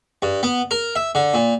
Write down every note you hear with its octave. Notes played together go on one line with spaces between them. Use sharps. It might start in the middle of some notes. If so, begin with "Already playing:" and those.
G2
B3
A#4
E5
D3
A#2